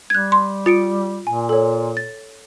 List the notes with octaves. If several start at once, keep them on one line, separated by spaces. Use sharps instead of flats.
G3 F#6 G#6
C6
F4 A6 C#7 D7
A#2 G#5
A4 C#5
A6